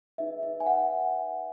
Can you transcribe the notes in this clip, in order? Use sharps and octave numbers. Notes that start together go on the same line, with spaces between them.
D#4 G#4 B4 E5
E5
G#5
F#5